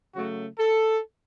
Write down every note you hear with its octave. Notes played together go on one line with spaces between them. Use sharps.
C#3 F#3 A3 F#4
A4